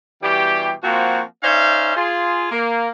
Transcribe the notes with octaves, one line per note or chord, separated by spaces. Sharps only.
B2 E3 G3 G4
F3 A#3 C4 F#4
C#4 D#4 C5 D5 E5 F5
F4 G#4
A#3